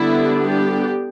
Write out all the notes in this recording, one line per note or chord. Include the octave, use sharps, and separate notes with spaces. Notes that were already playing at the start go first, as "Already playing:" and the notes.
Already playing: D3 G3 B3 D4 E4
G4